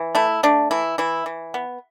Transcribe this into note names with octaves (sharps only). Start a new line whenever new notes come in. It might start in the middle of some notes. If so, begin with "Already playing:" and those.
Already playing: E3
A3 E4
A3 D4
E3 E4
E3 E4
E3
B3